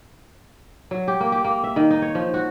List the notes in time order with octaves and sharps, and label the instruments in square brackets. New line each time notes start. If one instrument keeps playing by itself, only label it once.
[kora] F#3
G4
A#3
G4
A#3
E5
D#3
D#4
C#5
F3
F#4